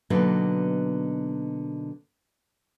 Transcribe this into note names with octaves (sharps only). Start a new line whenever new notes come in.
B2 D3 F#3 A#3 B3 D#4